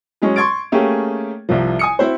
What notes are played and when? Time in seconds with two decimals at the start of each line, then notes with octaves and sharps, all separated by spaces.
0.22 F#3 G#3 C#4
0.36 C6 C#6 G#6 A6 D7
0.72 A3 A#3 C#4 G4 G#4
1.49 C2 C3 F3
1.79 G#5 D#6 C#7
1.99 C4 E4 F#4 C5